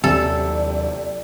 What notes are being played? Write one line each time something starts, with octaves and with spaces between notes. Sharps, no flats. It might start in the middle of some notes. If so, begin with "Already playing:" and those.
D#2 C3 F#3 C4 A4 D5